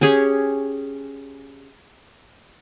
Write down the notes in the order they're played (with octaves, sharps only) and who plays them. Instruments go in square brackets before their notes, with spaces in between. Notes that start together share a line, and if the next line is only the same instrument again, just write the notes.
[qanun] C#4 G4 G#4 C#5